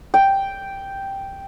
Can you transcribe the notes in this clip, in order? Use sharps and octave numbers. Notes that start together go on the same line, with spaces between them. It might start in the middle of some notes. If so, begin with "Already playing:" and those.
G5